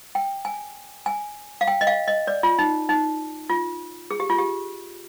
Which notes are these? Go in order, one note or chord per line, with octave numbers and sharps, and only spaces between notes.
G5
G#5
G#5
F5
G5
D#5
F5
D#5
D5
F4
D#4
D#4
F4
G#4
G4
F4
G4